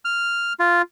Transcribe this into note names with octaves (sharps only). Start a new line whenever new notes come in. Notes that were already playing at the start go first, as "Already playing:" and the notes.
F6
F4